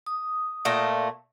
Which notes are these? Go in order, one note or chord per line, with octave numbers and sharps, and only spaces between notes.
D#6
A#2 A3 A#5